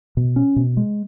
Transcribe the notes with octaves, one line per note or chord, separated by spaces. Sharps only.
B2
C#4
B2
G#3